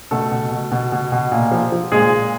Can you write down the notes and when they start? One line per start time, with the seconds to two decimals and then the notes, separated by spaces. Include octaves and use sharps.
0.11 B2 A3 A4
0.32 B2
0.51 B2
0.72 B2
0.92 B2
1.12 B2
1.32 A#2
1.51 F3
1.72 F3
1.92 A#2 G#3 G#4
2.11 A#2